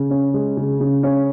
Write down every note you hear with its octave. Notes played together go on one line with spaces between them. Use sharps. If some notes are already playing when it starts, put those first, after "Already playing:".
Already playing: C#3
C#4
G#3
C#3
C#3
C#4